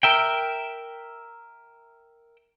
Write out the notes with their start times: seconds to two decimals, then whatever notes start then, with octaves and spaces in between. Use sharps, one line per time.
0.03 A#4 E5 G5